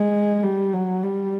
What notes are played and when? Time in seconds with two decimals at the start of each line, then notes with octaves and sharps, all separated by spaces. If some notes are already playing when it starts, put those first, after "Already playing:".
Already playing: G#3
0.43 G3
0.73 F#3
1.03 G3